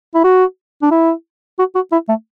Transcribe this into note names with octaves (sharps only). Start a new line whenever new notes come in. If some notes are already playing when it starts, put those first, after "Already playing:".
E4
F#4
D4
E4
F#4
F#4
E4
A3